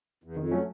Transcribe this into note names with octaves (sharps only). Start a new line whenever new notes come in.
E2
F2 D#3
F#3 A3 C#4